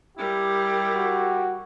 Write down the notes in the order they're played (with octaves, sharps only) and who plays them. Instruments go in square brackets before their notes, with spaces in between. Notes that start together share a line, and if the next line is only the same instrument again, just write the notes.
[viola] G3 A#4 [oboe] E4 [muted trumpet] G4
[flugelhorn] F#4